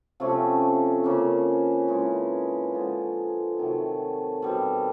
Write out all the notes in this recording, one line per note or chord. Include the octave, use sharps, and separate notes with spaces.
C3 F3 A3 C#4
C#3 F3 A#3 C#4
E3 G#3 C#4 F4
D3 F3 G#3
C3 D#3 F#3 A3
B2 G3 C4